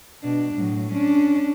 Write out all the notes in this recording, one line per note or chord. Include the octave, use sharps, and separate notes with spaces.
B2 D4
A2 F#3
C#4 D4